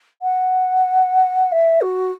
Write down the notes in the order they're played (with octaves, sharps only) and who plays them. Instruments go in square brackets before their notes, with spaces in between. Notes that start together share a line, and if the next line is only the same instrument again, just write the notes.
[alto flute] F#5
E5
F#4